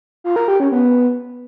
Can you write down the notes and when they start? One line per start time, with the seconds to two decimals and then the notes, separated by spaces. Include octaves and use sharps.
0.24 F4
0.36 A#4
0.48 G4
0.60 C#4
0.72 B3